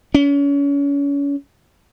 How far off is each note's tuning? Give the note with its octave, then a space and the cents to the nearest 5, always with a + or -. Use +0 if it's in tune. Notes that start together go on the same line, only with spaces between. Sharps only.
C#4 +35